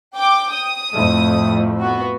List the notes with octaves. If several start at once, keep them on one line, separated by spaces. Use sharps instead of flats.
G5 D6
D#6
F2 A2 A3
B3 F#4